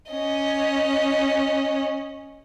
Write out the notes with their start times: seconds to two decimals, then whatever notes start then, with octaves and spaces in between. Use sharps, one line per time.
0.11 C#4 D#5